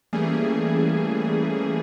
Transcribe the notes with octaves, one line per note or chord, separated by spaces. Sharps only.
E3 G3 A3 A#3 C#4 G#4